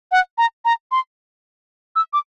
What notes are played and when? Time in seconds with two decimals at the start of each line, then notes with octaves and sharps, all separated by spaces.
0.12 F#5
0.38 A#5
0.65 A#5
0.92 C6
1.96 E6
2.13 D6